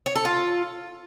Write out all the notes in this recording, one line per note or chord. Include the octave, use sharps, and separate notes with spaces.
C#5
A4
F4